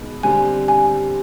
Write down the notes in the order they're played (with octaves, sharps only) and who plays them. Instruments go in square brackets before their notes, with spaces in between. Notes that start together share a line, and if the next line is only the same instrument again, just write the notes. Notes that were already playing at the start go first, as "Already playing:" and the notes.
Already playing: [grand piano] B2 G#3 B3 D#4
[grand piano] D3 G3 C4 [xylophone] G#5
[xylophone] G#5